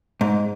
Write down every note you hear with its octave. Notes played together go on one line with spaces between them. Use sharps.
G#2